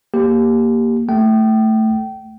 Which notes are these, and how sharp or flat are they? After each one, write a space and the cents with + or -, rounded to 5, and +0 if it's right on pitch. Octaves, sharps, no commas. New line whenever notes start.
A#3 +0 G4 +0
A3 +0 G5 -25